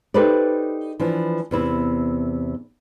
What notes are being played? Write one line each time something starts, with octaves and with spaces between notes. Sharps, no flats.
D#4 G4 A4 B4 C5 D5
E3 F3 D4
E2 C3 E4